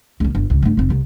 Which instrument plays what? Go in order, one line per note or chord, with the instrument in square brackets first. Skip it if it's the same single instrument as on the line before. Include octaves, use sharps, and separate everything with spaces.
[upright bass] C#2 A#3
G1
C#2
G2 A3
F1 C4
C2